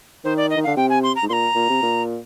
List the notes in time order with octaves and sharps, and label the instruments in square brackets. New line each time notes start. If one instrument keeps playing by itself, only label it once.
[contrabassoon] D#3 [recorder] C5
[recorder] D5
D#5
[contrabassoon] D#3
[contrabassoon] D3 [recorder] F5
[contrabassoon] C3 [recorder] G5
[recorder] G#5
C6
A#5
[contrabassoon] G#2
[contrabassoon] A#2 [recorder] A#5 C6
[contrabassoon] A#2
C3
A#2